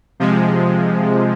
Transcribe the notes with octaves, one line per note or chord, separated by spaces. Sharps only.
C3 F3 G#3